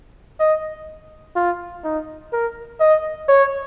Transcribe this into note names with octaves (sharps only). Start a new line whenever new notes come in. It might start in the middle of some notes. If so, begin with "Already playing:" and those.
D#5
F4
D#4
A#4
D#5
C#5